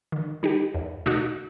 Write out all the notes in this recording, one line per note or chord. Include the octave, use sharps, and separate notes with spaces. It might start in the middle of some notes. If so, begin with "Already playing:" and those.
D#3
G3 D#4 G4
E2
B2 A3 D#4 F#4